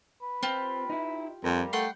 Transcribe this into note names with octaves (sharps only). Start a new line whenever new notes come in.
B4
C4 F4 G4
D#4 E4
F2 G3 A#4 F5
A3 F#5 G5 C6